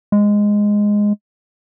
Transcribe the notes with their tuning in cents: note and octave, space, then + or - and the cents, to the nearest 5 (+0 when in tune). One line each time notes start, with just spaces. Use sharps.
G#3 -5